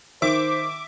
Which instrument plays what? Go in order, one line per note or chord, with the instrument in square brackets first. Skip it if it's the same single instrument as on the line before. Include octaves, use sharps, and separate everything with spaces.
[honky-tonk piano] D#3 [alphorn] C5 [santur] E5 [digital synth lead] D6